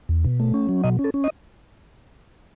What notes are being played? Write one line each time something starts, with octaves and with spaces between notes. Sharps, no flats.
E2
B2
A3
C#4
F#3
B2 D#5
C#4
A4
C#4
D#5